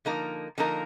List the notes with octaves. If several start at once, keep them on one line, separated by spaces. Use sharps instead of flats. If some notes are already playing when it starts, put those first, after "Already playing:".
D3 F3 A#3 D#4 A#4
D3 F3 A#3 D#4 A#4